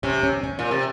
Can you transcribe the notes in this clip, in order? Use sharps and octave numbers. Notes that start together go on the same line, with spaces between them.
C3 C#4
C#4
C#4
A#2
C3